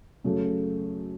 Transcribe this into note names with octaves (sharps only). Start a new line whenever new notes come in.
F#2 C#3 A3